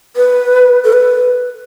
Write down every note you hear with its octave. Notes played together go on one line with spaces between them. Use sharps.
B4
A4
B4